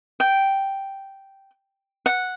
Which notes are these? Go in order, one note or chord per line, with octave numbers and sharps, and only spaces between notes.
G5
F#5